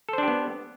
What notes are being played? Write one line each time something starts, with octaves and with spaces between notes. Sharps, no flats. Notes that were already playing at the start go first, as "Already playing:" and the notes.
B3 D4 G4 A4 C5